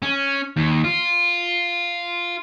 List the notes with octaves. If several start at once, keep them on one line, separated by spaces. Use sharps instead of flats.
C#4
D#2
F4